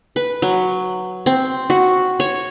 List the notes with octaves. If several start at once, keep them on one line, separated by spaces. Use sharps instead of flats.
B4
F#3
C4
F#4
C#5